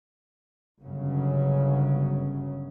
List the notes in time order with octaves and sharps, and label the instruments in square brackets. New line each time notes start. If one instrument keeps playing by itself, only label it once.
[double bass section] G1 F#2 C#3 F#3